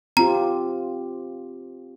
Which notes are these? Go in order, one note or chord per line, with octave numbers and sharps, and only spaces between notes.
C4 F4 G4 A#5